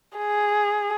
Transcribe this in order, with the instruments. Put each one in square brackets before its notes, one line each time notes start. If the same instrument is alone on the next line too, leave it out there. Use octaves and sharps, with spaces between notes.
[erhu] G#4